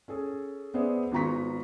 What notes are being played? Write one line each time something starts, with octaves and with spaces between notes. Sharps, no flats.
C#4 G#4 A4
B3 G#4 C5 D5 E5
G#1 B3 F4 A#5 C#6 B6